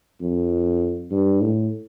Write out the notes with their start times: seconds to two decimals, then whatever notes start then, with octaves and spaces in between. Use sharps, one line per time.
0.21 F2
1.11 G2
1.41 A2